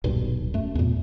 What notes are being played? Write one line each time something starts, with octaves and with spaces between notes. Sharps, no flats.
D#1 B1 G2
F#2 A3
E2 A#2